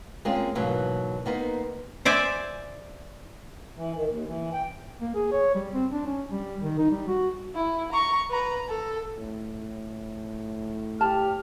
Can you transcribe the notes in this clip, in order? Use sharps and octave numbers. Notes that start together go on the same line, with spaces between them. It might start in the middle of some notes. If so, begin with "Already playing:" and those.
G#3 A#3 C4 C#4 F4
G#2 B2 E3 F#3 A#3
A#3 B3 D#4 C5
C5 D5 E5 G#5
E3
D#3
D#2
E3
G5
A#3
G#4
C#5
G3
C4
D4
C#4
G3
D#3
D#4
G3
F#4
E4
A#5 C#6
B4 A#5
A4
A2
G4 A5 F6